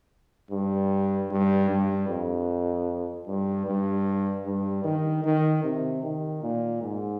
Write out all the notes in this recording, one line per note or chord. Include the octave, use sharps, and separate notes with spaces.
G2
G2
G2
F2
G2
G2
G2
D#3
D#3
C3
D#3
A#2
G#2